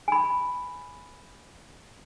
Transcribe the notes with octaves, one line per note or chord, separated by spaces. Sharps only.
G#5 B5